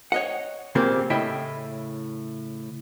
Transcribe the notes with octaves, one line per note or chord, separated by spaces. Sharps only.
C#5 D#5 F#5
A#2 C#3 A#3 C4 G4
A2 C#3 E4 D#5 G5